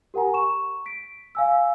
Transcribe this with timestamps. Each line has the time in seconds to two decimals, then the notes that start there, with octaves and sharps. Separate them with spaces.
0.14 G4 A#4 F#5 G#5 A#5
0.34 C#6 E7
0.86 B6 D7
1.35 F5 G#5 E6